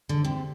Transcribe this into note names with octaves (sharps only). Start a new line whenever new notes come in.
D3
C3